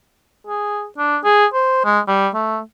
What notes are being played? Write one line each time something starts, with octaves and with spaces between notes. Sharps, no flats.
G#4
D4
G#4
C5
G#3
G3
A3